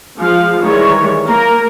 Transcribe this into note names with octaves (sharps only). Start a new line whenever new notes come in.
F3 G#3 F5
D#3 E3 G3 G#3 C#5
A#3 A#4